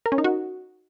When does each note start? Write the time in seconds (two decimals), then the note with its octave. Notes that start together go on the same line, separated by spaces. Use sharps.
0.06 A#4
0.12 C#4
0.18 D#4
0.24 F#4